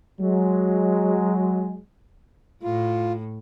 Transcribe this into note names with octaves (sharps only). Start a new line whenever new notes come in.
F#3 G#3
A2 F4